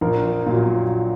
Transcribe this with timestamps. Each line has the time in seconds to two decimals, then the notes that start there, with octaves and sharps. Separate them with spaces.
0.01 A#1 A#4
0.46 A#2 F#3